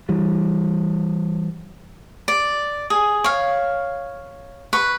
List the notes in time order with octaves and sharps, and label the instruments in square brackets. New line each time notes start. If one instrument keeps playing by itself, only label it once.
[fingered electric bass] E3 G3
[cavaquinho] D5
G#4
C#5 F5
B4 C#6